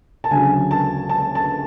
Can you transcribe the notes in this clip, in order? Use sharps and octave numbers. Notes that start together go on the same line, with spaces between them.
A5
D2 C#3 F#3 G#5
A5
A5
A5